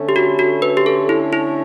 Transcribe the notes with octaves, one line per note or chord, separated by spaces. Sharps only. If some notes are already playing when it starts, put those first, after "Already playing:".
Already playing: D3 A3 C#4
G4
F#4
F#4
B4
G4
A4
E4
E4